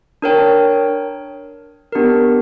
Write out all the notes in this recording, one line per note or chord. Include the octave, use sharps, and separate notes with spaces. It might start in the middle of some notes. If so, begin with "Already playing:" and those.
D4 A#4 C#5 G5
B3 D4 G4 A#4